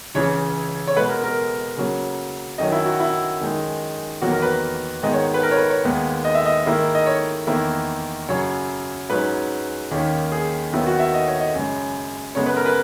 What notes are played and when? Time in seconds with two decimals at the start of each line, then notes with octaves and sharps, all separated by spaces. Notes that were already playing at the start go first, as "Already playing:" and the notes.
0.15 C#2 C#3 E3 C#5
0.87 C#5
0.96 B2 G#3 B3 B4
1.09 A#4
1.24 A#4
1.77 C#3 F#3 A#3
2.58 F#2 D#3 F#3 D#5
2.72 E4
2.85 F#4
3.00 E4
3.40 F#2 D#3 G#3 D#4
4.22 E2 D#3 F#3 A#3 F#4
4.32 A#4
4.42 B4
5.03 G#2 D#3 G#3 B3 D#5
5.13 C#5
5.34 B4
5.43 A#4
5.51 C#5
5.57 B4
5.70 C#5
5.84 D#2 D#3 G#3 B3
6.25 D#5
6.35 E5
6.46 D#5
6.66 G#2 D#3 A#3 E4
6.95 D#5
7.06 C#5
7.47 E2 D#3 A#3 E4
8.29 F#2 C#3 F#3 C#5
9.10 G#2 F#3 C#4 B4
9.91 D#2 D#3 A#3 C#4
10.32 G#4
10.72 D#2 D#3 F#3 B3 E4
10.87 F#4
10.99 E5
11.14 D#5
11.28 C#5
11.40 D#5
11.55 F#2 C#3 G#3
12.35 F#2 C#3 G#3 B3 C#5
12.46 B4
12.56 A#4
12.66 B4